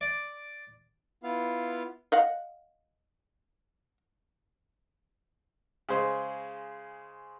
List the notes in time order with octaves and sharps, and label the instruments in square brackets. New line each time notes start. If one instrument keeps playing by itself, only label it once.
[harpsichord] D5
[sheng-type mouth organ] B3 E4 F4 F5
[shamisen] D#5 F5 F#5
[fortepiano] C#3 G#3 G#4 C5 D#5